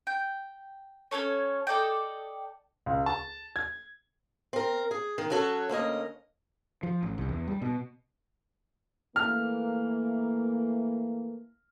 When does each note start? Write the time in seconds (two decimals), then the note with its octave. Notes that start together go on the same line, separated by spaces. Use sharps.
0.07 G5
1.11 C#4 D4 A4 C#5
1.67 A4 D5 D#5 G5
2.86 C#2
3.06 A5
3.56 G#6
4.53 C4 A#4
4.91 G#4
5.18 D#3
5.30 F#3 C#4 F#4 A4 C#5
5.69 D2 A#3 C#4 D#5
6.83 F3
7.03 A1
7.18 C2
7.29 E2
7.48 G3
7.62 B2
9.16 E3 A3 A#3 F6